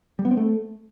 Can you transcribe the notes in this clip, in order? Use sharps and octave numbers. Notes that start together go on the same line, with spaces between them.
G3
B3
C4
A3